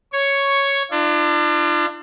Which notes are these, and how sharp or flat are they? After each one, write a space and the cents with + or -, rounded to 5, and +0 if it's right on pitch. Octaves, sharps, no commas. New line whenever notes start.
C#5 +0 C#6 +5
D4 +30 F4 -35